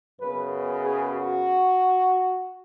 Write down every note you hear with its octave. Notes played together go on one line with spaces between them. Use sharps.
F#2 C#3 B3 B4
G#4
F#4